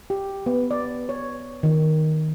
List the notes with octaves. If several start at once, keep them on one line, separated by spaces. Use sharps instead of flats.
G4
B3
D5
C#5
D#3